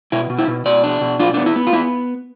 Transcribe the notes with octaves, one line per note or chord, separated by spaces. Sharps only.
B2 E4
B2
E4
B2
B2 D5
D4
B2
D4 F4
B3 D4
E4
B3
F4
B3 E4